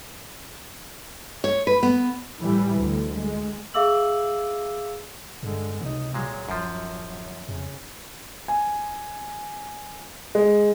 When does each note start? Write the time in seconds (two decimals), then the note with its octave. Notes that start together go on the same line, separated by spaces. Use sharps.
1.44 C#5
1.67 B4
1.83 B3
2.40 A2 E3 G3
2.77 D2
3.14 G#3
3.74 G#4 E5 F5 D6 E6 F#7
5.43 G2 D3 G#3
5.81 C#2 C3 D#4
6.14 A#2 F#3 G#3
6.49 D1 F#2 F3
7.48 F2 C#3
8.48 G#5
10.35 G#3